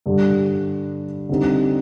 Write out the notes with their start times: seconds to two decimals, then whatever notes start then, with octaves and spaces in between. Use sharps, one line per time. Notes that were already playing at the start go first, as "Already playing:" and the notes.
0.06 G2 D3 G3
1.29 D3 G3 C4 D#4